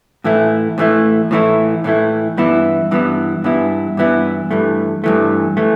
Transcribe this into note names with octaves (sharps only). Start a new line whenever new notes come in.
A2 E3 A3 E4
A2 E3 A3 E4
A2 E3 A3 E4
A2 E3 A3 E4
G2 E3 B3 E4
G2 E3 B3 E4
G2 E3 B3 E4
G2 E3 B3 E4
G2 E3 A3
G2 E3 A3
E3 A3